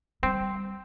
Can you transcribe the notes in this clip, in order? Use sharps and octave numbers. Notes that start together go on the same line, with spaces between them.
G3 C4